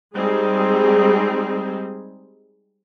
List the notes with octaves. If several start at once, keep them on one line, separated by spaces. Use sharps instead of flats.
G3 G#3 C4 D#4 G#4